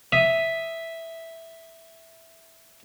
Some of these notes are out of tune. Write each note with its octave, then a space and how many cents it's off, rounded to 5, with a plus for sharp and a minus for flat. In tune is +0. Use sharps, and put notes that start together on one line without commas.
E5 +0 D#6 +0